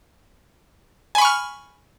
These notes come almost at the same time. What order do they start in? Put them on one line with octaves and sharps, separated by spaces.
G#5 B5 C#6 F6